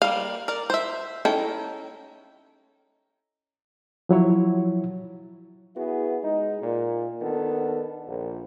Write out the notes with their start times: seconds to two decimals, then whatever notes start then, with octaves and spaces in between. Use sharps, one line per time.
0.02 G3 A#3 F5
0.48 A#4 D5
0.70 C5 E5
1.25 C#4 D#4 E4 A4 G5
4.09 F3 F#3 E4 C#5
5.76 B3 E4 F#4 G#4
6.23 G#3 D#4
6.61 A#2
7.22 D#3 B3 D4 A4
8.07 A#1